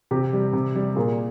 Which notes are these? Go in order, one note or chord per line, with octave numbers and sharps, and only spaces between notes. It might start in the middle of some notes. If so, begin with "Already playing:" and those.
C3 G4
G3
C3
G3
A#2 G#4